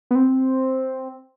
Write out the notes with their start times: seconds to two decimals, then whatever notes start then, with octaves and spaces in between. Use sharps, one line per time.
0.11 B3
0.15 C4